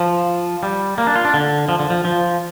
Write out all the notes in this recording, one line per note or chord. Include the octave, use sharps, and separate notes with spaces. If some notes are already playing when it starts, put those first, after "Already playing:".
Already playing: F3
G3
A#3
D4
F4
D4
D3
F3
D3
F3
F3